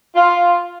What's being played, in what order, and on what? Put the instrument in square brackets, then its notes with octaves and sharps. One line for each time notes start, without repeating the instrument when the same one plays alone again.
[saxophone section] F4